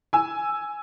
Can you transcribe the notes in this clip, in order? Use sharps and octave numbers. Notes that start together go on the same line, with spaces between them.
G#5 E6